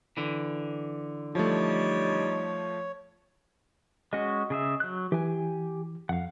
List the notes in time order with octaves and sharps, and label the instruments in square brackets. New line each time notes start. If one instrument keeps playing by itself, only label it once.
[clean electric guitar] D3 E3
[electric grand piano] F3 A3 [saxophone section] G3 D#4 [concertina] C#5
[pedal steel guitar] G#3 C#4 F#4 [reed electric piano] D#5
[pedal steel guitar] C#3 G#4 E5
F#3 F#6
[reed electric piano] E3 [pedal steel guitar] G4 G#5
[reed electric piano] F2 [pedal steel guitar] F5 F#5